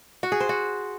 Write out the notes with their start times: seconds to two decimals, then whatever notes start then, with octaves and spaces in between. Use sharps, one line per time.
0.23 F#4
0.32 G#4
0.40 C5
0.49 F#4